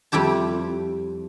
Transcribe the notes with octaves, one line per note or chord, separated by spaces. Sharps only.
F2 G3 E4 G4 A5